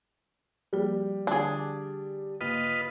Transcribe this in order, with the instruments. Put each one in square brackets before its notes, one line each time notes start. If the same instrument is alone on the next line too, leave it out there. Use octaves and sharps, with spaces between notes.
[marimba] F3 A#3 G#4 [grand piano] G3
[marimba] D3 [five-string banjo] D4 G#4
[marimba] G2 C#3 A#3 [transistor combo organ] F4 B4 D#5